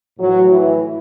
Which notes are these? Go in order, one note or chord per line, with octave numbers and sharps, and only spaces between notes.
A2 E3 F#3
E3